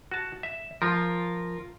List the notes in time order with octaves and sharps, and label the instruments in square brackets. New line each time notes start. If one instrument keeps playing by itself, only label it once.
[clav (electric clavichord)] F#4 A5
E5
[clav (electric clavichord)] F3 [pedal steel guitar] F4 A#4